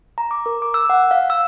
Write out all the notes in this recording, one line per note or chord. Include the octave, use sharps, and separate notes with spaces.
A#5
D6
A#4
D6
E6
F#5
F5
E6